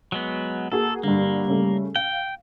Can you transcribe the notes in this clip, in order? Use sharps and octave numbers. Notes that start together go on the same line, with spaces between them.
F#3 G#3 B3
A#3 F#4 G#4 A4
G2 D3 G3 A#3
C#3 A3
F5 G5